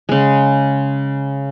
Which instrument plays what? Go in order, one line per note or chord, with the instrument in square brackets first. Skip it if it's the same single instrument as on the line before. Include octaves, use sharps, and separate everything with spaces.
[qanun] C#3 G#3